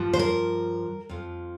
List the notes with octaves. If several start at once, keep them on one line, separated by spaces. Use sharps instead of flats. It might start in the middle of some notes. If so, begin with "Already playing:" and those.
Already playing: G2 F3
C5
A#4
F2 F3